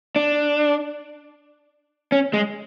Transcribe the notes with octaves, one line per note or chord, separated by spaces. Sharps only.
D4
C#4
G#3